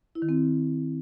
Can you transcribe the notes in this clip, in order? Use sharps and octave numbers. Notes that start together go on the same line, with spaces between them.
E4
D#3
C4